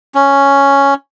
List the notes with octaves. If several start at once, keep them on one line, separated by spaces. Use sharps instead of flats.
C#4